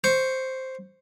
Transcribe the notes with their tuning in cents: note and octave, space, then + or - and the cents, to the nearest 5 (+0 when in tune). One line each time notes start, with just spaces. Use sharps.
C5 +0 C#6 +0